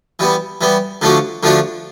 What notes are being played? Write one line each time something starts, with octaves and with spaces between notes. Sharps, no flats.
E3 G3 B3
E3 G3 B3
D3 F3 A3 D4 F#4
D3 F3 A3 D4 F#4